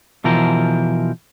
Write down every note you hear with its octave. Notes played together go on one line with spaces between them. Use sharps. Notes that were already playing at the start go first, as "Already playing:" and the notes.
B2 E3 F3 A#4